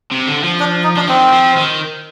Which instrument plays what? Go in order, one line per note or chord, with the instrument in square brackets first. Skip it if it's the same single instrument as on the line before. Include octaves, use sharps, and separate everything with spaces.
[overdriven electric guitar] C3
D3
F3
[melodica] D4
D#4
[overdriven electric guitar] F3 [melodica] D4
[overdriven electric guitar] D#3 [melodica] C4
[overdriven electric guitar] F3
D#3